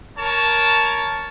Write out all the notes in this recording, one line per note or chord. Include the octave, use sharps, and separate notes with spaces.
A#4 C#5 A5